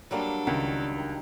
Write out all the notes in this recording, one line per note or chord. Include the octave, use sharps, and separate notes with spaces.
F#3 G3 A#3 D4 A4
C#2 D#3